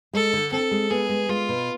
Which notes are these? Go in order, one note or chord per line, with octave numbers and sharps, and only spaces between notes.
G#3 A4
D3
C4 A4
G#3
B3 G#4
G#3
G#3 F4
B2